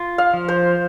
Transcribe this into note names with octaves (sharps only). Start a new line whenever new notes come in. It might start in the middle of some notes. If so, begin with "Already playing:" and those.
Already playing: F4
F5
F3
C5